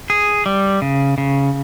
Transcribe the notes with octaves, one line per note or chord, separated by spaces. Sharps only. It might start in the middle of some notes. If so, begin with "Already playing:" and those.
G#4
G3
C#3
C#3